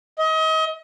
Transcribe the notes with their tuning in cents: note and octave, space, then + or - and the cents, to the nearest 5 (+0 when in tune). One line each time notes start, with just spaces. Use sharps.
D#5 +35